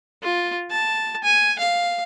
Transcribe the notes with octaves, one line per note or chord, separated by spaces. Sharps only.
F4
A5
G#5
F5